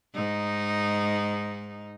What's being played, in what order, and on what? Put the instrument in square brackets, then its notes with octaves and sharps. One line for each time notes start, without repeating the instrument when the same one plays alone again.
[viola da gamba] G#2 D#4